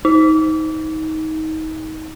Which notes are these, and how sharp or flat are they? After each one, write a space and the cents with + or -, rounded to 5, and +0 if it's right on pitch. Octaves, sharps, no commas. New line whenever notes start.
D#4 +25